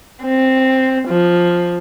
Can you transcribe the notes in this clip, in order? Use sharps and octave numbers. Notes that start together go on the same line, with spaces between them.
C4
F3